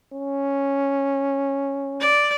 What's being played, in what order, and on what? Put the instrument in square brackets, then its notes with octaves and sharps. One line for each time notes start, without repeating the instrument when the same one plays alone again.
[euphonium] C#4
[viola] D5